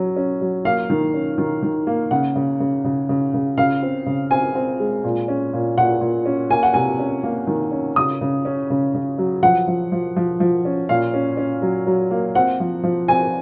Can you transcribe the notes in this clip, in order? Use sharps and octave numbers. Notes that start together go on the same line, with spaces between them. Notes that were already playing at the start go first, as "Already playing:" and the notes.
Already playing: F#3 C#4
C#4
F#3
A#3 F5
D#3
C#4
D#3
D#3
A#3
C#3 F#5
C#3
C#3
C#3
C#3
C#3
C#3 F5
C4
C#3
C4 G#5
C4
G#3
A#2
C#4
A#2
A#2 F#5
A#2
C#4
A#3 G#5
F#5
C3 G#5
C#4
A#3
D#3
C#4
C#3 D#6
C#3
C#4
C#3
C#3
F#3
F3 F#5
F3
F3
F3
F3
C#4
A#2 F5
C#4
C#4
F#3
F#3
A#3
C4 F#5
F3
F3
C4 G#5